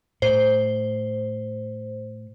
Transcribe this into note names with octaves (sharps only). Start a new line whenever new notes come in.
A2 C5